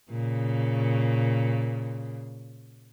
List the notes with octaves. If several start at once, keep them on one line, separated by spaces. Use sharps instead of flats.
A#2 C#3